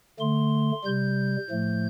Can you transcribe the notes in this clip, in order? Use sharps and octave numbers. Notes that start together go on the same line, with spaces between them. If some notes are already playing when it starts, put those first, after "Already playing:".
D3 A3 C6
C3 G3 G6
A2 F3 A3